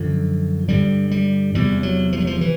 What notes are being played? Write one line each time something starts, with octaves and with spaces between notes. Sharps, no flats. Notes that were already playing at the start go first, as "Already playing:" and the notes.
Already playing: F#2 D3 F3
G2 D3 G3
G3
E2 C3 G3
F#3
F3
F#3
F3
E3